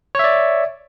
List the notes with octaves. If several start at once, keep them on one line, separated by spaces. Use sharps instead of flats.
C#5 D5 E5